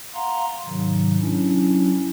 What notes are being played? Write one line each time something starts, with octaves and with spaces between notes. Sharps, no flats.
F5 F#5 A#5 C6
G#2 C3 D#3 F#3
F#3 C#4 D4 E4